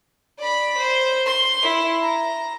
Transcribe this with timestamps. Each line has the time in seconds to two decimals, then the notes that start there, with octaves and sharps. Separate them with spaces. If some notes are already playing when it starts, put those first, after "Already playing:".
0.38 D5 B5
0.77 C5
1.26 C6
1.62 E4
2.02 A#5